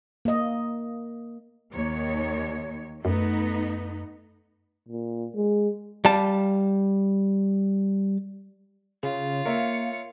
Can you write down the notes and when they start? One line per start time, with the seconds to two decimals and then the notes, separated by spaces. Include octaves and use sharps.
0.25 A#3 D#5
1.74 D#2 D#3 C#5
3.05 F#2 A3 B3 D#4
4.89 A#2
5.35 G#3
6.05 G3 F5 A5
9.03 C#3 F4
9.45 A#3 A#4 C#5 E5 C#7